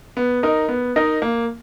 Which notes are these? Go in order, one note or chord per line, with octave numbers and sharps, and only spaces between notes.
B3
D#4 A#4 D#5
B3
D#4 A#4 D#5
A#3